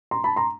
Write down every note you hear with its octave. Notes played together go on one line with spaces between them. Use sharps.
A#5 C6
A5 B5
A#5 C6